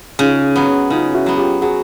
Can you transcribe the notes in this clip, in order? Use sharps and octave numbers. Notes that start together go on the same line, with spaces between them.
C#3 D#4 F4
F#3 B3
C#3 D#4 F4
E4 F#4
F#3 B3
F4 G4
F#3 F#4 G#4